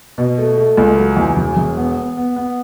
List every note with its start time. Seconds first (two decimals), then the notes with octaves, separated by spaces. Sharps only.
0.18 B2
0.38 A3
0.57 A3
0.77 C#2
0.97 F#3
1.17 E2
1.37 E1
1.57 E1
1.77 B3
1.97 B3
2.17 B3
2.36 B3